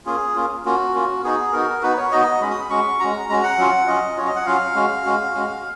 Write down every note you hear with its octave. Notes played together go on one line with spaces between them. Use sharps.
A#3 C#4 F4 G#4
A#3 C#4 F4
A#3 C#4 F4 F#4
A#3 C#4 F4
B3 D#4 F#4 G#4
B3 D#4 F#4 A#4
B3 D#4 F#4 B4
C#5
B3 D#4 F#4 D#5
G#3 C#4 F#4 B5
D#6
B5
G#3 C#4 F#4 C#6
G#3 C#4 F#4 A#5
G#3 C#4 F#4 A#5
F#5
F#3 C#4 F4
F#3 C#4 F4 D#5
F#3 C#4 F4 C#5
D#5
F#5
F#3 C#4 F4 F5
G#3 C#4 F#4
G#3 C#4 F#4
G#3 C#4 F#4